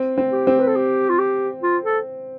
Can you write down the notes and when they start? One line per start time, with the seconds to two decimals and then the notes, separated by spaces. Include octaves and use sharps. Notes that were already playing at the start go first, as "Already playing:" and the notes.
Already playing: C4
0.18 C4
0.32 G4
0.47 C4
0.59 B4
0.68 A4
0.75 G4
1.09 F4
1.19 G4
1.62 F4
1.84 A4